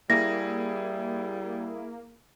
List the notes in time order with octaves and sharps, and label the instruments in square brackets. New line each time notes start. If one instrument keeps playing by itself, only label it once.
[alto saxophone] G3 [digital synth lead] A#3 [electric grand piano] E4 G#4 [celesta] A#6